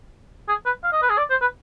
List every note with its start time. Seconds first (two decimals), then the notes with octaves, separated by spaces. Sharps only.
0.48 G#4
0.66 B4
0.84 F5
0.92 D#5
1.02 B4
1.10 G#4
1.18 D5
1.30 C5
1.41 B4